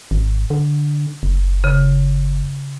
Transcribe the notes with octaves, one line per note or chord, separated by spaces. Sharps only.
G#1
D3
F#1
C#3